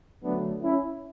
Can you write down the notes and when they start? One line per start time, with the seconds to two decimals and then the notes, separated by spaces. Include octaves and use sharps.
0.22 D3 F#3 A3 B3 D4
0.62 C#4 E4